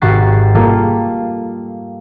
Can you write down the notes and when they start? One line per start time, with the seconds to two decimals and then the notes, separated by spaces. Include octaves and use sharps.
0.02 G#1 F#4 G4 C#6 A6 C7
0.55 G3 A#3 F4 A4